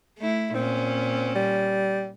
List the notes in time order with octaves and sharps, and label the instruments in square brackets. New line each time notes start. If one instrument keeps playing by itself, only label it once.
[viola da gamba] A3 E4
[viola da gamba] A#2 C#4 [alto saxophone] C4
[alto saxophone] G3